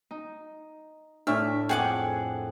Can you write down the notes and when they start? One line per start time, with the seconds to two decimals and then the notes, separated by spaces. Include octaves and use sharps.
0.11 D#4
1.27 A2 D4 D5 E5 C#6 F6
1.69 F2 G#4 F#5 G5 D6